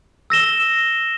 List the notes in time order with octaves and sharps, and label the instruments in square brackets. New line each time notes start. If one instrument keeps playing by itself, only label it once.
[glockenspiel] E6 A#6 E7 G7